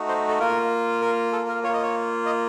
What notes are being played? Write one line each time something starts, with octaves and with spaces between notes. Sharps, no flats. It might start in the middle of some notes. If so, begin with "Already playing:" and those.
Already playing: A3 D#4 F#4
C5
A4
A#3 F4 A#4
A#4
A4
A#4
A#3 F4 C#5 D#5
C#5
D#5